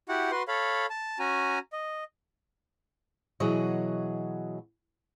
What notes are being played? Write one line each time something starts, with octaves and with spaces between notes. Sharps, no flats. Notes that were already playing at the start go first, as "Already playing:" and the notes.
E4 F#4 G4 F#5
F#4 B4 C6
A4 C#5 F5 B5
A5
C#4 F#4 G#5 A#5
D#5
B2 E3 F#3 F#4 G#4 D#5